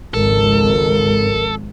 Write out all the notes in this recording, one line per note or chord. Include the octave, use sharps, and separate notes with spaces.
G#1 C#2 F3 A4 A#4